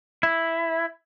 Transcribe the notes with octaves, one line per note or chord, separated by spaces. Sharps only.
E4